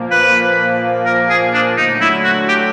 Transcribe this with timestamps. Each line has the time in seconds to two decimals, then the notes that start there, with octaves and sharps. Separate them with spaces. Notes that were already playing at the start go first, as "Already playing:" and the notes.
Already playing: A#2 F3 A#3
0.11 B4
1.06 A#4
1.30 G#4
1.53 D4
1.77 D3 F#3 A3 D#4
2.01 E4
2.24 F#4
2.48 G4